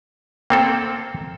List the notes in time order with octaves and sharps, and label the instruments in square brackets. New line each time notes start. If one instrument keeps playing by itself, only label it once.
[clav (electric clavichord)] A#3 C4 A4 [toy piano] G5